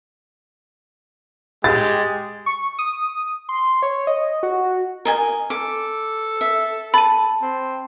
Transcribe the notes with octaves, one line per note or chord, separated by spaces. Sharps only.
G#3 G4 A6
C#6
D#6
C6
C#5
D#5
F#4
A#4 D#5 G#5
A4 D6
E5
A5 B5 D#7
C4